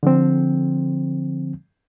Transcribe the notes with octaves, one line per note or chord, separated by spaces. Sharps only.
D3 F3 C4